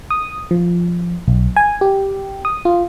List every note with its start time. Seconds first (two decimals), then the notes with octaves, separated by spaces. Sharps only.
0.11 D#6
0.51 F3
1.28 B1
1.56 G#5
1.81 G4
2.45 D#6
2.65 F4